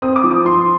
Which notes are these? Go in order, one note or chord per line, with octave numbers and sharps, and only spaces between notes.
C4 D#6
D6
F3
D6
F3 C6